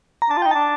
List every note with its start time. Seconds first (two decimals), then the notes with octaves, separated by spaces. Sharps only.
0.22 A#5
0.29 D4 A5
0.37 F4
0.42 D#4 G5
0.51 D4 A5